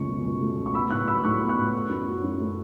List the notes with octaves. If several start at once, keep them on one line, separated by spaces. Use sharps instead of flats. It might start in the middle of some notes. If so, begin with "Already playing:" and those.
Already playing: C#2 F#2 A3 C#6
B2
C#2
A3
C#2
C#6
B3 B5 E6
A2 C#6 F#6
F#3 B5 E6
A2 C#6 F#6
B3
C#6 F#6
A2
A3
F#2
F#3
F#2
A3